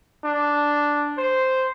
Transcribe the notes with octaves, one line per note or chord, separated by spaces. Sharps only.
D4
C5